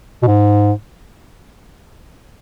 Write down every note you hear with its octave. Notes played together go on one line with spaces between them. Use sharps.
B2
G#2